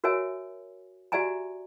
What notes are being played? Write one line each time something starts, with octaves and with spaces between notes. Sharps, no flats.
F#4 A#4 C#5 E5 G#5
F#4 G4 D5 E5 G#5 A#5